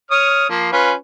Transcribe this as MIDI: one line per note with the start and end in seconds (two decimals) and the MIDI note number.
0.11 0.46 73
0.11 0.46 87
0.11 0.46 89
0.49 0.71 53
0.49 0.71 58
0.72 0.93 61
0.72 0.93 65
0.72 0.93 71